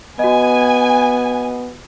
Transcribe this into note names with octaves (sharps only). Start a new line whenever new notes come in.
B3 F#4 D#5 G#5